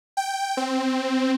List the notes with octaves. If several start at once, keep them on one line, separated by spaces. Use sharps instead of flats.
G5
C4